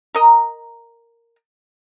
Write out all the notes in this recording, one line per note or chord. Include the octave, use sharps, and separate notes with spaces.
A#4 D#5 A#5